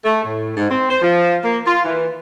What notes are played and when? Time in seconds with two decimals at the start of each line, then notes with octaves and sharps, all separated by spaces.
0.05 A3
0.24 A2
0.57 G#2
0.71 C4
0.90 C5
1.02 F3
1.45 A#3
1.67 F4
1.85 E3